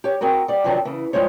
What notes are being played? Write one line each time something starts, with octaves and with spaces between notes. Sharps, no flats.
G4 C#5
C4 F#4 G#4 A#4
G3 D5
C3 D#3 F3 F#3 C4 D4
C#3 E3
G2 F3 G#3 C5 C#5